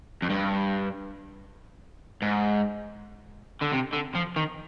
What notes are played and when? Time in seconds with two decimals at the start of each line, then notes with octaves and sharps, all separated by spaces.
0.22 F2
0.30 G2
2.22 G#2
3.62 D3
3.73 C3
3.93 D3
4.15 F3
4.36 D#3